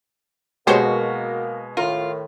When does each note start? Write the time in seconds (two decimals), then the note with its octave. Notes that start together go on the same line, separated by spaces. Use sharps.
0.67 B2 G#3 A#3 F#4 G4 A#4 C5 C#5
1.77 A2 D#3 F4 A#4